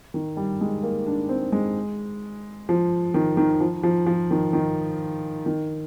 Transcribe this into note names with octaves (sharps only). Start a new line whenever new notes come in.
D#3
G3
G#3
A#3
D4
C4
G#3
F3
D#3
D#3
F3
F3
F3
D#3
D#3
D#3